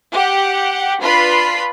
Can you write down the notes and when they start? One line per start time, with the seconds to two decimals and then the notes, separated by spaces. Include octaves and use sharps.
0.13 G4 F#5
1.01 D4 F4 B4 B5 C7